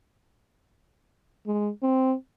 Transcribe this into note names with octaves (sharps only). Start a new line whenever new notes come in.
G#3
C4